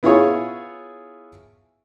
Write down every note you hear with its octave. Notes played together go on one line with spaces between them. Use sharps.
B3 E4 F4 G#4 C#5